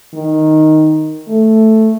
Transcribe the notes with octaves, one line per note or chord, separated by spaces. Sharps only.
D#3
A3